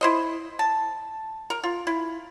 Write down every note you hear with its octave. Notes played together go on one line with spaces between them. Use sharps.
E4 C5 D#5
A5
A#4
F4
E4